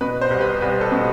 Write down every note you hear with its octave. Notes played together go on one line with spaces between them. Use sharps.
B2 B4
C5
C2
B4
C2 B4
A4
B2